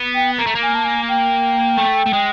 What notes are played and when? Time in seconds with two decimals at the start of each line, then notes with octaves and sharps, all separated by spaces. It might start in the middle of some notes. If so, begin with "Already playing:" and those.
Already playing: B3
0.15 G5
0.39 A#3 A#5
0.47 A3
0.55 A#3
0.62 G#5
0.75 A5
0.85 G#5
1.09 G5
1.78 A3
2.06 A3
2.13 G#3